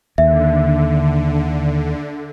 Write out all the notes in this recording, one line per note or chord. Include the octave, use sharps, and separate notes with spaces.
D#2 D3 E5